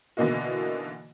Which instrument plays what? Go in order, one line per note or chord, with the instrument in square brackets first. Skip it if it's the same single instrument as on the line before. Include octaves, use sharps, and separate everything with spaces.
[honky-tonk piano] B2 D3 E3 A#3 D#4 F#4